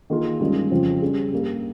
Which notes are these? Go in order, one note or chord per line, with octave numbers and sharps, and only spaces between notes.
D#3 A#3 F4 G#4
G2 D#3 G#3 C#4 F4
F2 C#3 F3 C4 F4
G3 C#4 G#4
G2 G3 A#3